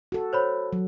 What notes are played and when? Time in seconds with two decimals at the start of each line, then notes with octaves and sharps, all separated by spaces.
0.12 F#4 A4
0.33 C5 C#5 B5
0.73 F#3